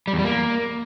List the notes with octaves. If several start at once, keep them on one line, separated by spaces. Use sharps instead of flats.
G3
E2
G3
A#3